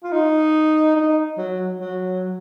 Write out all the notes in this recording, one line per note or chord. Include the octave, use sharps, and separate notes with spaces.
F4
D#4
D#4
F#3
F#3